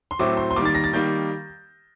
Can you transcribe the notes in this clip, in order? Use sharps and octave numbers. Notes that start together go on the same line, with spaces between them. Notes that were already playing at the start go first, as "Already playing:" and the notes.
C6
A2 F#3 A3 C4 D6
C6
C6
D#3 G3 A#3 D6
A6
A#6
A6
D#3 G3 A#3 G6